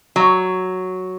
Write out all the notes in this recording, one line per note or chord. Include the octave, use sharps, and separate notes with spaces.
F#3